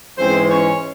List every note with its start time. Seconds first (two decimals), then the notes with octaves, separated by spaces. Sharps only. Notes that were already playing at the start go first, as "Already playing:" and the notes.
0.18 G#2 E3 G#3 C4 C#4 C5
0.48 C#4 C#5